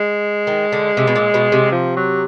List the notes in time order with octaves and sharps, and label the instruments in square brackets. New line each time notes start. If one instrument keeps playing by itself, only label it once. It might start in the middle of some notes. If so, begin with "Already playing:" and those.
Already playing: [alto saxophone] G#3
[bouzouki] D#3
D3
C3
B2
A#2
B2
C3
[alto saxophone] F3
F#3